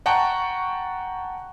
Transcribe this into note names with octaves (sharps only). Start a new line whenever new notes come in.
F#5 G5 A5 A#5 C#6